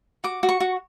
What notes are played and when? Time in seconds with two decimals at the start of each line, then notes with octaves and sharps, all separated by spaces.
0.24 F#4 D6
0.43 F#4
0.49 C#6
0.60 F#4